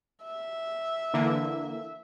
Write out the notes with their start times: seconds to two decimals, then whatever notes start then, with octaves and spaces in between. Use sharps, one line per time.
0.25 E5
1.14 D3 E3 A#3